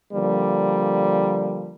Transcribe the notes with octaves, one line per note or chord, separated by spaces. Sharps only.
D3 F3 G3 A#3